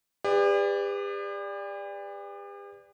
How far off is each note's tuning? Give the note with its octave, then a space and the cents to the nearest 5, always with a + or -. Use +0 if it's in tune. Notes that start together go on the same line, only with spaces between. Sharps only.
G4 +45 B4 +25 D5 +0